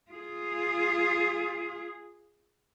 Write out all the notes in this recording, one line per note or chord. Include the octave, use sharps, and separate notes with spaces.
F4 G#4